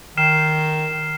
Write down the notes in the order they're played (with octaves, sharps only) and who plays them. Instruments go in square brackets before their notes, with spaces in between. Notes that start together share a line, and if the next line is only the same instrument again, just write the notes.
[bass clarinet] D#3 [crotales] F6 C7 E7